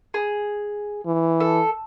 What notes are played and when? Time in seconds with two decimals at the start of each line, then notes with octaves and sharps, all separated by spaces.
0.14 G#4
1.06 E3
1.40 A4